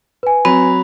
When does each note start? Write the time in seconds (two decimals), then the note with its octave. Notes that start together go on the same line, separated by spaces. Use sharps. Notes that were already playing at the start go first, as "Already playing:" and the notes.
0.23 B4 G#5
0.45 F#3 C4 B5